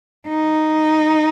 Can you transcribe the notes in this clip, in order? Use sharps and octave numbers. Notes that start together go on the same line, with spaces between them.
D#4